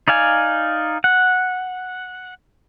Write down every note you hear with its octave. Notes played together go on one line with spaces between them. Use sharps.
D#4 D5 F5 G#5
F#5